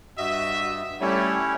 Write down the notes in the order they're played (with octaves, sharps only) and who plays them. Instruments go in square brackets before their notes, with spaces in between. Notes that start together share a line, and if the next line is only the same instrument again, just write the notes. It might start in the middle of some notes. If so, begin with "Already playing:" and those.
[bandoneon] G2 [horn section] F#4 D#5 E5
[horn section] G3 A3 [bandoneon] C#4 E4 C#5